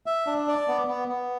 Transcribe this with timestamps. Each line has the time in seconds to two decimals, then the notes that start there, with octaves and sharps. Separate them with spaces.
0.06 E5
0.27 D4
0.48 D5
0.68 B3
0.87 B3
1.08 B3